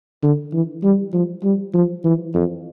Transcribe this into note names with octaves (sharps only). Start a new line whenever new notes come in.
D3
E3
G3
F3
G3
F3
E3
F2